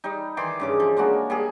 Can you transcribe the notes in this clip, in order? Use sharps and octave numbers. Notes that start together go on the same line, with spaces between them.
G3 D#4
D#3 E3 C6 D6
G2 C#3 D6
F3
G#3 A#3 D4 F#4
G3 A#3 G#4